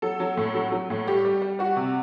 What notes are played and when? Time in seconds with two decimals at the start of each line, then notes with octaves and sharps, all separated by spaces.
0.02 F#3 A4
0.20 F#3
0.37 A2
0.55 F#3
0.72 F#3
0.90 A2
1.07 G3 G4
1.25 G3
1.42 G3
1.59 G3 F#4
1.77 C3